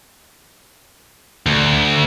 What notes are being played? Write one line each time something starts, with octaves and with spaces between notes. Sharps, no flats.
D2